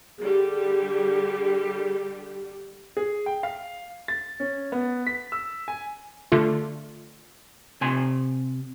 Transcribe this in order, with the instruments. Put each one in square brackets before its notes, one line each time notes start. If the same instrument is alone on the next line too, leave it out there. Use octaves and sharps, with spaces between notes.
[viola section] D3 G3 G4 [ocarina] G#4
[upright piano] G#4
G5
F5
A6
C#4
B3
B6
E6
G#5
[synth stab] D3 A3 F4
[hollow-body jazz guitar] C3 G#5 C6